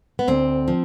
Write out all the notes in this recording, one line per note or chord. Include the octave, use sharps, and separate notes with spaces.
B3
D2 C4
F3